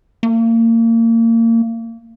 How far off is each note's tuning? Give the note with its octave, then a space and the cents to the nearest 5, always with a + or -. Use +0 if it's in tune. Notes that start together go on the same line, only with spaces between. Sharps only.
A#3 -30